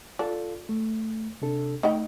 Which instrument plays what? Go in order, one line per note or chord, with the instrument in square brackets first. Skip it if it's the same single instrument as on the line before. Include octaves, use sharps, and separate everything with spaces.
[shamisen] D4 [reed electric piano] F4 A4
[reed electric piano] A3
C3 D4 A4
[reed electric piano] A3 D#5 [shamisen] D#4 E4 G5